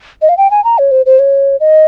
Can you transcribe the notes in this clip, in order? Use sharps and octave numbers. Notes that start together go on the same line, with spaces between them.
D#5
F5
G5
G#5
A#5
C#5
C5
C5
C#5
D#5